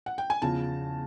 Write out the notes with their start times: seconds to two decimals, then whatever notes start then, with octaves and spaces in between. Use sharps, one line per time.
0.06 F#5
0.18 G5
0.30 G#5
0.42 E2 C#3 F3 A5